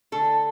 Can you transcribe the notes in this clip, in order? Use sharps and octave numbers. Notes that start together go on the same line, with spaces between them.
D3 A3 A4